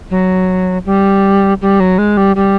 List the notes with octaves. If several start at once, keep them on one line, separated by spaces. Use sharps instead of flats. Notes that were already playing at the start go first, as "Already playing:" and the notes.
F#3
G3
G3
F#3
G#3
G3
G3